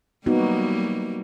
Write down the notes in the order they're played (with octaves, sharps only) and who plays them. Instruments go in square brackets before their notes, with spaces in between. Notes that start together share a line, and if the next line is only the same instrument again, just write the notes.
[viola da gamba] F#3 G3 A#3 [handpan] B3 D#4 F#4